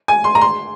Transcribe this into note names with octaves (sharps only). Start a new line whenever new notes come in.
G#5
C6
A#5
C6